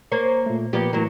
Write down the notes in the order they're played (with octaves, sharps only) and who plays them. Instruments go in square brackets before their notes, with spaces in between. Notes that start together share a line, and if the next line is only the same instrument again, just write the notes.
[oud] A#3 C5 C#5
[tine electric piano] A#2 A3
[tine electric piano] A#2 F3 [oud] A#3 B3 G4
[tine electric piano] A2 E3 [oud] F#3 A#3